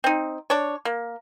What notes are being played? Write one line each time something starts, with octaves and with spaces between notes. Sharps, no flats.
C4 D#4
D4 C#5
A#3